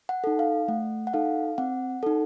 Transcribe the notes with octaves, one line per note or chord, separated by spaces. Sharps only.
F#5
D#4 A4
F5
A3 F#5
F#5
D#4 A4 F5
C4 F#5
D#4 A4